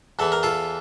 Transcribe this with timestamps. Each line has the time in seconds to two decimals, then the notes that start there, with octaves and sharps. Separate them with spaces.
0.19 E2 E3 A4
0.32 A#4
0.43 F4 A4